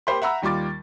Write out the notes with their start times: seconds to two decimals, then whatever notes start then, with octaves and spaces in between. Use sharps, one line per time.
0.07 A#3 G4 C5 B5
0.22 E5 F#5 A#5 B5 E6
0.42 D#2 G3 F4 D6 A6